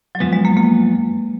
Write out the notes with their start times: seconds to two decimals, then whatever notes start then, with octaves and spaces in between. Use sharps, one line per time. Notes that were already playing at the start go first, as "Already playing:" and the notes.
0.15 F#3
0.20 F#2 F3 G#3 B3
0.33 G#3
0.45 A#3
0.57 A#3